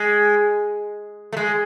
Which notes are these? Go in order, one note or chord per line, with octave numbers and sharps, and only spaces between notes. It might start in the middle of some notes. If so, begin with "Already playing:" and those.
Already playing: G#3
A3
G#3